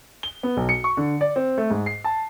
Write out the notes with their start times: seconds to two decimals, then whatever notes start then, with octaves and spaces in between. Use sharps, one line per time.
0.23 G7
0.43 B3
0.57 B1
0.69 C#7
0.84 C#6
0.97 D3
1.21 D5
1.36 C4
1.58 A3
1.70 G#2
1.86 C7
2.04 A5